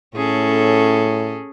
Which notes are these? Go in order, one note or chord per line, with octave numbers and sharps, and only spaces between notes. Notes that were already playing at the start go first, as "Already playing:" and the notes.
A2 C#4 G#4 A4